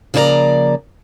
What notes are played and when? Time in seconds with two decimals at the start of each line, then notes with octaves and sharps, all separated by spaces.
0.14 C#3 F3 A#3 C#5 D5 A#5